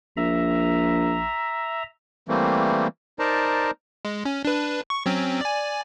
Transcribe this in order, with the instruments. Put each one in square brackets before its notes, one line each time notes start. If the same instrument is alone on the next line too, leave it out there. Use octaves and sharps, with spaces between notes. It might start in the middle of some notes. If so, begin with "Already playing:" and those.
[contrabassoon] A#1 [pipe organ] E5 A#5
[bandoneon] E3 G3 A3 A#3 C4
D#4 A#4 C5 D5 A5 A#5
[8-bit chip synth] G#3
C#4
D4 B4
C#6
F#3 C4 C#4
D5 G#5